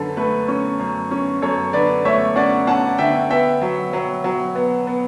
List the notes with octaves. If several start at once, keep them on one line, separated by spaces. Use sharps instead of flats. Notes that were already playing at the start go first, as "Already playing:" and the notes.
Already playing: F#2 D3 A4 B4
A3 B4
C#4
F#2
C#4
F#2 A4 C#5
D3 B4 D5
A3 C#5 E5
C#4 D5 F#5
C#4 F#5 A5
D3 E5 G5
B3 E5 G5
F#3
F#3
F#3
B3
B3